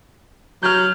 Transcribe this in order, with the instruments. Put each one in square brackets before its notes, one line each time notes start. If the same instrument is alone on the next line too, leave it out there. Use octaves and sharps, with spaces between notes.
[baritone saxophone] F#3 [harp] F6 G6